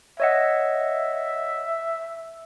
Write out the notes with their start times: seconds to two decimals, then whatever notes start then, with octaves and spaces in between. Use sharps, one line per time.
0.20 C#5 D#5 E5 F#5